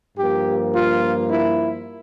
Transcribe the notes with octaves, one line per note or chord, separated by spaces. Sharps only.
G2 F3 A#3 G4
F4
E4